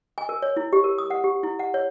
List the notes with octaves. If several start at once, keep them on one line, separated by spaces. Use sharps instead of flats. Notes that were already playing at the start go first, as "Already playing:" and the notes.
G#5
A#4
C#5
E4
G4
A#4
D#6
F#5
G4
E4
F#5
C#5